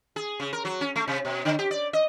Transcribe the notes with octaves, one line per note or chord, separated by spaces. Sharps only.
G#4
C#3
A#4
F#3
C#4
A3
C3
B2
D3
G4
D5
D#5